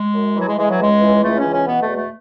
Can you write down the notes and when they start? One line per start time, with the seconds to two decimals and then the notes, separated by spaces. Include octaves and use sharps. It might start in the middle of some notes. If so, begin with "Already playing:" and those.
Already playing: G#3
0.15 F#2
0.36 E3 F#3
0.48 G#3
0.58 E3 G#3
0.69 F#3
0.80 C#2 G#3
1.01 E3
1.23 C#2 A3
1.37 C#4
1.44 E3
1.52 C#4
1.66 B2 B3
1.81 A3
1.88 E2
1.95 A3